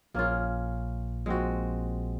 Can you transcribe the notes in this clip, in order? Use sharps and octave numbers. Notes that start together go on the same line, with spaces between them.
A#1 A#2 A#3 C#4 F4
A#1 A#2 G#3 C4 F#4